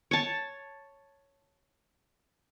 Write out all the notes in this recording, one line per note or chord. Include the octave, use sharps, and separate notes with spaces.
C#5 A5